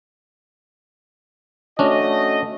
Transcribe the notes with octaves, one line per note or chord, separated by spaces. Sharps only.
A3 C#4 D4 F#4 D#5